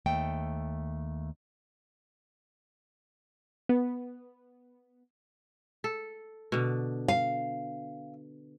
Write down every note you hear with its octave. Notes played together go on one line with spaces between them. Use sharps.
D#2 A3 G5
B3
A4
B2 D3
F5